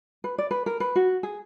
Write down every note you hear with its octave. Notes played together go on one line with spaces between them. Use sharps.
B4
D5
B4
A#4
B4
F#4
G#4